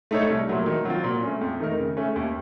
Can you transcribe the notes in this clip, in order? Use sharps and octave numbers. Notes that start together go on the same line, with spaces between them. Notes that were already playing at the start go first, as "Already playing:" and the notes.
A3 D#4 A4 C#5
C2
A#2 F#3 A3
D#3
F#3 C4 F4
A#2
A3 C#4
F2
D#3 A3 D#4 A#4
C#3
A3 C#4
D#2